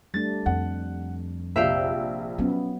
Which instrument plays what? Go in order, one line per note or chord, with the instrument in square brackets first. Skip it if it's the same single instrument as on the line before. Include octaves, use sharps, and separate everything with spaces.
[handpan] G3 A3 D4 [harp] A6
[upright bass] F2 [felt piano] F#5
[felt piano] A#1 C3 [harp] E5 F5 G5
[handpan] F#3 B3 [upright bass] C#4